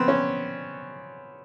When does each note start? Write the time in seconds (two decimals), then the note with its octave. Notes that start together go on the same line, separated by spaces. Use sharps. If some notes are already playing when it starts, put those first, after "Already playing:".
Already playing: B3 C4
0.08 C#4